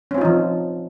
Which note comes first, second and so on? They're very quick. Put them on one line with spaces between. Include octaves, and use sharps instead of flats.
C#4 C4 F4 D#4 F3